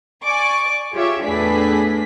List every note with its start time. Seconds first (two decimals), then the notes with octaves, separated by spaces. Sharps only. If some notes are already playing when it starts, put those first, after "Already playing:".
0.24 D5 G#5 C#6 D6
0.92 F4 G4 G#4 C#5 E5
1.23 E2 A2 D4 G#4 B4 B6